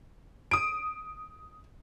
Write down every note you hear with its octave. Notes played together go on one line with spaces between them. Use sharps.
D#6 D7